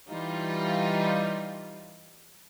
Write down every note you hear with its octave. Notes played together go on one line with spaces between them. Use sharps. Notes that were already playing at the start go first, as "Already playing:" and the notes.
E3 G3 D#4 F4